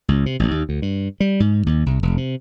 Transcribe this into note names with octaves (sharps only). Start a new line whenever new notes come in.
C#2
C3
A1
D#2
D2
G2
G3
G#2
D#2
C2
F1
C3